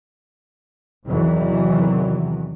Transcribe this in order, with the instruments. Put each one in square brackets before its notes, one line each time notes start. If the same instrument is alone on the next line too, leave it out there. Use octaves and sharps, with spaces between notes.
[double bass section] E2 C3 D#3 E3 F#3